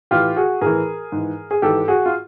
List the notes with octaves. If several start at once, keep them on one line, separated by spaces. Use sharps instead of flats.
A2 E3 F4 G4
F#4 G#4
A2 E3 G#4 A#4
G#2 E3
G#4
G#2 E3 G4 A4
F#4 G#4
F4